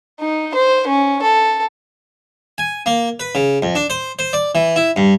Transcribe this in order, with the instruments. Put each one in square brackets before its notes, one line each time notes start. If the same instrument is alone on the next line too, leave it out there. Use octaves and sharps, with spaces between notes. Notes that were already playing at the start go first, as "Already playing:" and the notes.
[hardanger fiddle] D#4
C5
C#4
A4
[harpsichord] G#5
A#3
B4
C#3
F2
D4
C5
C5
D5
E3
E4
G2